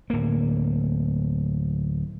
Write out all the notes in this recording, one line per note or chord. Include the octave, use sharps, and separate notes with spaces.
D1 A#3